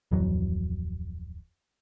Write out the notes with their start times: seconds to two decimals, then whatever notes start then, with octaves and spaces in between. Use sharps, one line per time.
0.11 D1 F2 E3 F#3